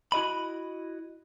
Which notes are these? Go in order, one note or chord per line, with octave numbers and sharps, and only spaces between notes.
E4 F#4 D#5 B5